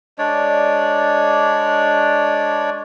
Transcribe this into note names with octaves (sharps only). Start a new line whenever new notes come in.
G#3 D4 C#5 D5